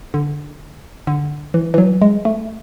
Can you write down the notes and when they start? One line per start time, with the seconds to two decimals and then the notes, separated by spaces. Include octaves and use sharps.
0.14 D3
1.07 D3
1.54 E3
1.74 E3
1.78 F#3
2.02 G#3
2.25 A3